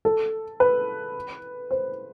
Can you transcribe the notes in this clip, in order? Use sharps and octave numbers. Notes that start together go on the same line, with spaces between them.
A4
B4
C5